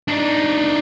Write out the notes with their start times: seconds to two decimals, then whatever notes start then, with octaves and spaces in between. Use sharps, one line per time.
0.08 D4 D#4